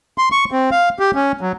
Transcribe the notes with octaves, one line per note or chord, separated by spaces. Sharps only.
C6
C#6
C4
F5
G4
C#4
F#3